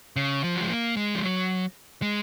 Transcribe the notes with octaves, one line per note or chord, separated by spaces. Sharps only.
C#3
F3
F#3
G#3
A#3
G#3
F3
F#3
G#3